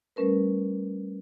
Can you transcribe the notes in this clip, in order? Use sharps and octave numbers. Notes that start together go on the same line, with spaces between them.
G3 A3 C#4 A#4 B4